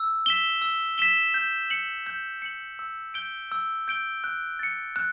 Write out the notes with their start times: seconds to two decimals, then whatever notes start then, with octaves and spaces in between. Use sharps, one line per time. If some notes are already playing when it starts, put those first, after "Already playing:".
Already playing: E6
0.26 B6 E7 G7
0.62 E6
0.98 B6 E7 G7
1.34 G6
1.70 C#7 F#7
2.06 G6
2.42 C#7 F#7
2.79 E6
3.14 G6 D7 G7
3.52 E6
3.88 G6 D7 G7
4.24 F#6
4.59 A6 C#7
4.96 F#6